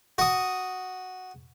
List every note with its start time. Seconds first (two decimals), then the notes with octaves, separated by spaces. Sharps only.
0.18 F#4 D#6